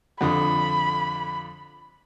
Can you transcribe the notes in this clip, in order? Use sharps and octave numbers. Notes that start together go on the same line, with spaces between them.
F2 D3 B5 D#6